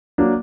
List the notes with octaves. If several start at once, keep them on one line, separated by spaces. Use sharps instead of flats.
F#3 A#3 D4